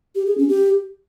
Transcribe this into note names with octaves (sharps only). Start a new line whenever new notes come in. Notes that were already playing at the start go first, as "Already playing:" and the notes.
G4
G#4
C#4
G4